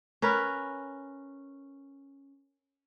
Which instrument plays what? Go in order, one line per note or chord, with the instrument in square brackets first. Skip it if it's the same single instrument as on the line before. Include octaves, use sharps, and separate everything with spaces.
[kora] C#4 A#4 B4